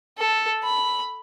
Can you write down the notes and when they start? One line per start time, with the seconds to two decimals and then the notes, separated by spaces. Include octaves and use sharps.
0.18 A4
0.64 B5